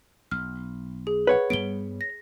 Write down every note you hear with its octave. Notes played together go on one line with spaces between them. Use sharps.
B1 F6
G#4
B4 C#5 F#5
G2 G3 B3 D7 G7
A#6